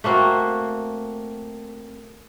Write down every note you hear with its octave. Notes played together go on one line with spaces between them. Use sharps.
A3 A#3 C4 F#4